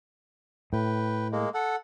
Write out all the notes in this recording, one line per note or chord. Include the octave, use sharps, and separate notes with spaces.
A2 B4 G5
G#3 A#3
A4 F#5